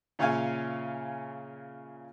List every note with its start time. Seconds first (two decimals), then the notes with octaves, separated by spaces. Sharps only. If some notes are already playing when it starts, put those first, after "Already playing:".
0.19 A#2 C#3 C#5 E5 F5 G#5